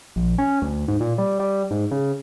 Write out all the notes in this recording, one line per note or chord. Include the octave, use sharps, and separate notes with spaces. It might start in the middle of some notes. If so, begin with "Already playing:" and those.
A#1
C#4
D2
G#2
A#2
G3
G3
G#2
C#3